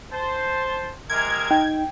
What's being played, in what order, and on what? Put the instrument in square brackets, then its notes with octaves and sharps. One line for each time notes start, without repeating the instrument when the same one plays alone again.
[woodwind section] C5 A5
[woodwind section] C3 G#3 A#4 [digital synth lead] G#6
[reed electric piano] D#4 [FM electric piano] G5